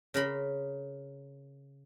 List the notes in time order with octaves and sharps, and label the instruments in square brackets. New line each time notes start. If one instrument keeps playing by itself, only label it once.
[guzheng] C#3 A#4 B5 C6